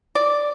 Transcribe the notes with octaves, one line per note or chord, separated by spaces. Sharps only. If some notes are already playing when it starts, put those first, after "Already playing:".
D5